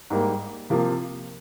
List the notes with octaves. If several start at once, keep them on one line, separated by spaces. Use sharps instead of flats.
G#2 G3 A#3
C3 F3 A#3